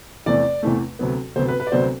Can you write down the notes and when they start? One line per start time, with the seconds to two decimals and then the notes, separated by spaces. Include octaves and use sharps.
0.26 E2 C3 E3 A3 D5
0.63 E2 C3 E3 A3
0.99 D2 C3 F#3 B3
1.36 D2 C3 F#3 B3 C5
1.48 B4
1.60 B4
1.67 D5
1.72 D2 C3 F#3 B3 C5